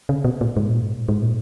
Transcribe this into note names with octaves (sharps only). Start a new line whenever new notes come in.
C#3
B2
A#2
G#2
A#2
G#2
A#2
G#2
A#2